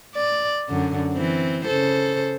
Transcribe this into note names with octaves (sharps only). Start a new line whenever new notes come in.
D5
F#2 D3
E3 C4
C#3 A4 C5